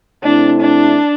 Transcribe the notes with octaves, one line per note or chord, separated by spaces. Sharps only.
C3 A3 C4 D4 E4
D4